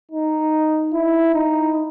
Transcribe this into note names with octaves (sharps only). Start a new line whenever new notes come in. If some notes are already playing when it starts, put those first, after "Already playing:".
D#4
E4
D#4